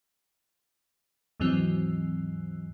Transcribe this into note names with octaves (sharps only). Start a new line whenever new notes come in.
D#2 G#2 E3 F#3 C4